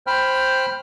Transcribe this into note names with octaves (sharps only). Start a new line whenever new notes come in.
C5 G5 B5 F6